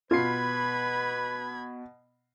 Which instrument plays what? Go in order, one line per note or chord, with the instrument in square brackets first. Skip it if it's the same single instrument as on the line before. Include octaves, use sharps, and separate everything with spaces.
[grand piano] B2 C7 [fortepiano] F4 [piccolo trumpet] B4 [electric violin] B5 G#6